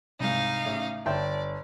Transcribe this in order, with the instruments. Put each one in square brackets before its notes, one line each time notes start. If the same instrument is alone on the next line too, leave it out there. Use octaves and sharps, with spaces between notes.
[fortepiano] C2 G#2 [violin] D#4 F5
[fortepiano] A1 C#3
[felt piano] G1 [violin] D5 [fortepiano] E5 G5 A5